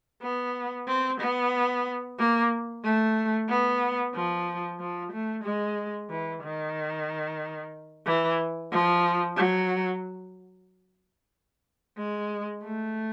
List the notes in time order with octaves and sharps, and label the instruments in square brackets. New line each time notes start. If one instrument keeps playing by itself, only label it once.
[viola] B3
C4
B3
A#3
A3
B3
F3
F3
A3
G#3
E3
D#3
E3
F3
F#3
G#3
A3